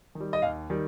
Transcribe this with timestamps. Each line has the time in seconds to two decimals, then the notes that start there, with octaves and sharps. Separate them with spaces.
0.15 D#3
0.20 G3
0.33 D#5
0.42 D#2 F5
0.70 D#3 G3